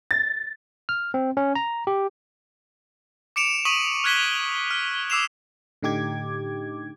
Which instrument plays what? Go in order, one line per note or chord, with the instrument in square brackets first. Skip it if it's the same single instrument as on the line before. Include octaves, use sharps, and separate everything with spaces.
[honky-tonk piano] A6
[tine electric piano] F6
C4
C#4
A#5
G4
[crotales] D6 C#7 D7 E7 F7
C#6 D#6 B6 D#7 F#7
F6 F#6 G#6 B6 E7 G7
F6
D6 E6 C7 E7 F7
[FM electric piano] A2 D3 D#4 G4 D6 G#6